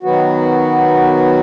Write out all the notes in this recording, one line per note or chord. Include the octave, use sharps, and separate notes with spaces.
D#3 F#3 B3 F#4